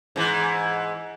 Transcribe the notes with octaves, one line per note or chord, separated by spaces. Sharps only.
G#2 E3